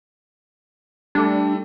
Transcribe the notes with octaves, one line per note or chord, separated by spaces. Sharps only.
G3 A3 D4 A4